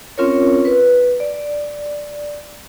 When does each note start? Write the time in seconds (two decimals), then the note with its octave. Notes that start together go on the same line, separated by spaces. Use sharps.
0.18 C4 C#4 F4 A#4 C#5
0.65 B4
1.20 D5